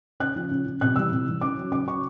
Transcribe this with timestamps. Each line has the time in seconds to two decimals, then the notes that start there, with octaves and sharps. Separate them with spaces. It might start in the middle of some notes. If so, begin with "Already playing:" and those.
0.20 C#3 F#6
0.36 F3
0.51 C#3
0.65 F3
0.81 C3 F#6
0.96 E3 G3 E6
1.12 C3
1.26 E3 G3
1.41 C#3 D6
1.57 F#3
1.71 C#3 D6
1.87 F#3 C#6